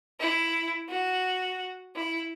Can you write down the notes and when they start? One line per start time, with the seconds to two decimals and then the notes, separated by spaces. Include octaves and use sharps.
0.20 E4
0.90 F#4
1.95 E4